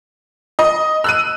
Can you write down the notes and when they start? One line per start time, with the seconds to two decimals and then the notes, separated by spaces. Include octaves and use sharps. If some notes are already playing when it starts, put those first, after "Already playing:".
0.59 D#5
1.04 E6 F#6 D#7